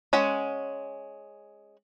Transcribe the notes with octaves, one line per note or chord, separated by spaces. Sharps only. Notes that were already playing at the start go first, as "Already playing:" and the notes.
G#3 C#4 F#5